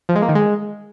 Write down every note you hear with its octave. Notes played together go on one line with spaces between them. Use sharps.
F3
G#3
A#3
D#3
G#3